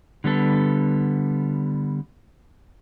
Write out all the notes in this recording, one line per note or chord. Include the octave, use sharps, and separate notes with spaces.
D3 G3 B3 A4